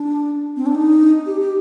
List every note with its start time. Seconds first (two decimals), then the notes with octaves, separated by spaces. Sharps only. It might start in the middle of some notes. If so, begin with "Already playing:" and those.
Already playing: D4
0.56 C4
0.66 D4
0.75 D#4
1.26 G4
1.41 G4